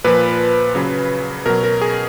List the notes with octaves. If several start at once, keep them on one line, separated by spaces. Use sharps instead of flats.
A#2 F3 B4
C#3 F#3
B2 F#3 A#4
A#4
G#4